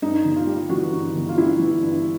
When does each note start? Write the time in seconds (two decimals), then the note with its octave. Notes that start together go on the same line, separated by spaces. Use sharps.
0.02 G2 D#4
0.25 G1
0.36 F4
0.47 G3
0.69 E3 F#4
0.93 G2
1.15 G1
1.29 F4
1.37 G3 E4
1.60 E3
1.82 G2